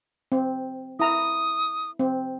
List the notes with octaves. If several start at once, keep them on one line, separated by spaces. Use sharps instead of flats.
C4
E4 A#5 D#6
C4